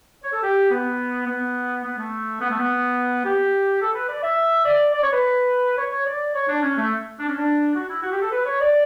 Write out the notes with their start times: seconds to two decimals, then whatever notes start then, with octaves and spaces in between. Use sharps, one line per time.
0.24 C#5
0.33 A4
0.43 G4
0.71 B3
1.27 B3
1.84 B3
1.97 A3
2.40 B3
2.50 A3
2.58 B3
3.25 G4
3.81 A4
3.94 B4
4.09 D5
4.22 E5
4.66 D5
4.93 D5
5.03 C#5
5.12 B4
5.78 C#5
5.92 C#5
6.06 D5
6.34 C#5
6.48 D4
6.63 C#4
6.77 A3
7.19 D4
7.28 C#4
7.38 D4
7.75 F#4
7.89 E4
8.03 F#4
8.13 G4
8.22 A4
8.32 B4
8.45 C#5
8.60 D5